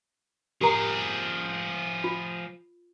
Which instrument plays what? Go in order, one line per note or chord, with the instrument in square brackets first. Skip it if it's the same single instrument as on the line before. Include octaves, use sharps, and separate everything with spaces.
[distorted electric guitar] F3 G#4 [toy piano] G4 A#4 A#5
[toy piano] F4